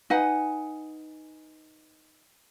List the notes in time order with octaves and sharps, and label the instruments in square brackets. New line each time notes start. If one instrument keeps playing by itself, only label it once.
[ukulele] D#4 B4 F#5 G#5